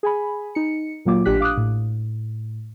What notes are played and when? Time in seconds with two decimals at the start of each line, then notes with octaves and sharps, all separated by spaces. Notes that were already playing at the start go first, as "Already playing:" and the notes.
0.03 G#4 G#5 B5
0.55 D#4 C#7
1.05 A#2 F#3 A#3 F4 D6
1.25 A1 D4 G4 F#6 B6
1.40 F5 D6 D#6 F#6
1.57 A2